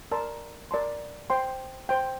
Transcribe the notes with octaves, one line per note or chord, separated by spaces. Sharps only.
A#4 D5 A5 C6
A#4 D5 A5 C6
C5 G5 C6
C5 G5 C6